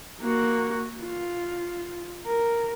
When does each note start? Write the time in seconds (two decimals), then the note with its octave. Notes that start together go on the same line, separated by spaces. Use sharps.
0.21 A#3 F#4
1.01 F4
2.26 A#4